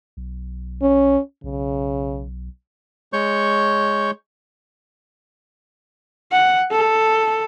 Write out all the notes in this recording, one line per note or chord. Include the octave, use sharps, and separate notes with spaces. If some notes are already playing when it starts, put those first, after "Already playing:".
B1
C#4
B1 C#3
G#3 C#5 C#6 G6
F#5
A4